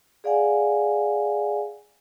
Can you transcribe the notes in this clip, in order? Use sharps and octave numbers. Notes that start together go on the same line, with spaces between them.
G#4 D5 F5 F#5 G#5